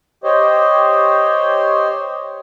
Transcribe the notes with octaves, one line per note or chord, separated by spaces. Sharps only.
G4 C5 C#5 D#5